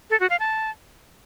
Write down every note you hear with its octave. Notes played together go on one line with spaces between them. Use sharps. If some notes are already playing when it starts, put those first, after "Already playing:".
A4
F#4
F5
A5